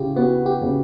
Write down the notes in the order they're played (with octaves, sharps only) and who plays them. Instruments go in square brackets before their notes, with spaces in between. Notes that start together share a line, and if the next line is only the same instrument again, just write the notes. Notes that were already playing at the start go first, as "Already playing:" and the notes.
Already playing: [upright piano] C#3 [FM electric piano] E4 F4 G4
[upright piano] B3 [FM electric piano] F#4
[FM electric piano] G4
[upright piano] C#3